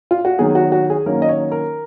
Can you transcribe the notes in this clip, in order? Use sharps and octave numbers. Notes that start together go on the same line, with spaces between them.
F4
F#4
D#3 F#3 B3 G#4
F#4
F#4
G#4
D#3 F#3 A#3 C#4 A#4
D#5
C#5
A#4